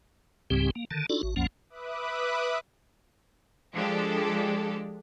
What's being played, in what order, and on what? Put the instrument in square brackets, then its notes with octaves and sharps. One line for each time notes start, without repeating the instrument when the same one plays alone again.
[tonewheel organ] C#2 G#2 C#3 G3 C4 G4
A#3
D3 D#3 A5
D4 D#4 F4 F#4 A4 D5
A1 F#4
B1 F2 F3 A#3 C#4 F#5
[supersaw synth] B4 E5 B5 D6 D#6 F#6
[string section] F3 G#3 D4 G4 A4